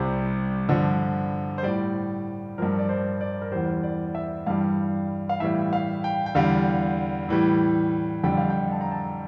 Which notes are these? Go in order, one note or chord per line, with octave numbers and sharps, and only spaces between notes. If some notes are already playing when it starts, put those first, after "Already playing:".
Already playing: C2 C3 G3 C5
G2 D3 F3
C5
A2 G3 D5
G2 F3 A#4
D5
C5
D5
A#4
E2 E3 G3 C5
D5
E5
G2 E3 G3 F5
F5
A2 E3 G3 E5
F5
G5
G5
E2 D3 G3 F5
A2 E3 G3
F2 D3 G3 G5
F5
G5
A5
A#5
A5